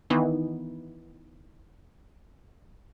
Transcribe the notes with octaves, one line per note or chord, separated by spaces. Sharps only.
D#3 E3 B3 D#4